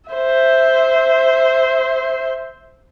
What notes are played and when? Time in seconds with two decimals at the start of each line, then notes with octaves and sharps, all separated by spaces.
0.10 C5 E5